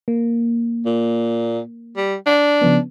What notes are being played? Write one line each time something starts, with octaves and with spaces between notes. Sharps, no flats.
A#3
A#2
G3
D4
C#3 F3 B3